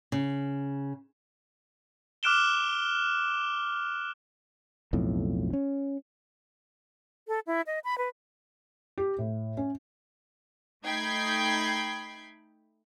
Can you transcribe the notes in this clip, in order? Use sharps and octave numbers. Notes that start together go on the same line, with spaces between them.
C#3
D6 F6 F#6 D7 E7 G7
B1 F2 A2
C#4
A4
E4
D#5
B5
B4
G4
A2
C#4
A3 D#4 G5 B5 G#6 C7